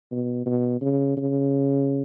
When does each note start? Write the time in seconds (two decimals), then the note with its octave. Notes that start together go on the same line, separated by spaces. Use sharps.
0.12 B2
0.46 B2
0.81 C#3
1.17 C#3